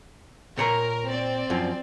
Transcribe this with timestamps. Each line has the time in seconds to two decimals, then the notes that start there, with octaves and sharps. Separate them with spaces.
0.57 A#2 A#4 C#5 A#5
1.10 C4 D5
1.50 F#2 F3